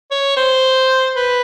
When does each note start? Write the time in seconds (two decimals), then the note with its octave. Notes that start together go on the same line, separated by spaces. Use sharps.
0.11 C#5
0.37 C5
1.16 B4